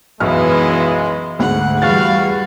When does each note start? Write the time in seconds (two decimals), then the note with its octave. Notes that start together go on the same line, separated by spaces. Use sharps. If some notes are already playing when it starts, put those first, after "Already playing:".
0.20 B1 F#2 E3 G#3 B3 E4 F6
1.39 D2 G#2 A3 F#5
1.82 E2 G3 F#4 F5 A6